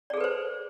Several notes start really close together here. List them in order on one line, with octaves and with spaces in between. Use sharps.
D5 G#4 A4 B4 C5